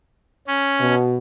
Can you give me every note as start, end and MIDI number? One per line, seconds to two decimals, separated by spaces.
0.47 0.95 61
0.80 1.18 47